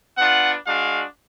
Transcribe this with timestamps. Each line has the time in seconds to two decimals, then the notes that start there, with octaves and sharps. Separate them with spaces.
0.17 B3 D4 F4 F#5
0.66 G#3 D4 F#4 F5